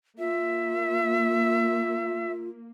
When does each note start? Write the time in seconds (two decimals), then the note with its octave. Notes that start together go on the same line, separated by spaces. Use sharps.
0.18 A#3 F4 E5